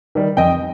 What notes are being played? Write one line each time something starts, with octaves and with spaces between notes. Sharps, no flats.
D#3 G3
F2 D#5 G5